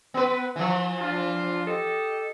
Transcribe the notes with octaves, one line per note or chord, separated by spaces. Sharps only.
B3 B4
E3 F3
D4 F4
G4 A4 D#5